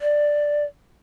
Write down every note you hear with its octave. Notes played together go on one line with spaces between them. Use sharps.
D5